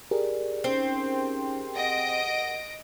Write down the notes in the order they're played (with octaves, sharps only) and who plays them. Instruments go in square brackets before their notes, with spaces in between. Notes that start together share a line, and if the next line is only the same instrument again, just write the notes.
[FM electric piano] G4 G#4 A#4 [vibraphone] D5
[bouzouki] C4 [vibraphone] C#4 D#4
[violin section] D#5 A#6 D7 [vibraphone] F#5